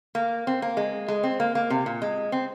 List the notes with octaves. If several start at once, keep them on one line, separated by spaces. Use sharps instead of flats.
A#3
C4
A#3
G#3
G#3
C4
A#3
A#3
C3
A#2
G#3
C4